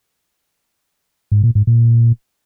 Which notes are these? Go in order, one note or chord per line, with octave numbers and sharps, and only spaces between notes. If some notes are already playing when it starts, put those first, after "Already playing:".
G#2
A#2
G#2
A#2